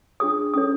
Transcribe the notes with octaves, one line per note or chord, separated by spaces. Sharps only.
D4 F4 G#4 C#5 D#6
C#4 E4 A4 C#5 D#6